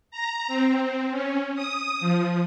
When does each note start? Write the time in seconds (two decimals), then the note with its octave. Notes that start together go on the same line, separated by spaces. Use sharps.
0.11 A#5
0.48 C4
1.11 C#4
1.55 D#6
2.00 F3